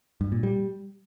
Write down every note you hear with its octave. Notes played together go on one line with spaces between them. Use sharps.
G2
A#2
G3